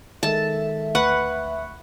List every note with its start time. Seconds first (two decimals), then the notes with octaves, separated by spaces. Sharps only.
0.23 D#3 G#3 A4 E5 A5
0.95 D2 B4 F#5 C#6